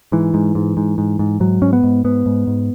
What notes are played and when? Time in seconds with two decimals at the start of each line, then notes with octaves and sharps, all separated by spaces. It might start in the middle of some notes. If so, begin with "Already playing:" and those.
0.12 G#2 E3
0.34 G#2
0.55 G#2
0.77 G#2
0.98 G#2
1.19 G#2
1.40 G#2 F#3
1.62 G#2 C#4
1.73 B3
1.84 G#2
2.04 G#2 B3
2.26 G#2
2.47 G#2